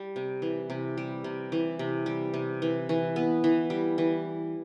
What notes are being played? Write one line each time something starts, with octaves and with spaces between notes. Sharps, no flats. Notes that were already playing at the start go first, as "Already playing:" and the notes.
Already playing: G3
C3
E3
C3
G3
C3
E3
C3
G3
C3
E3
E3
B3
E3
G3
E3